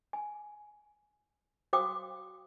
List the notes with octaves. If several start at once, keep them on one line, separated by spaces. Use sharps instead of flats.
G#5
F#4 C5 F5 G5 D6 D#6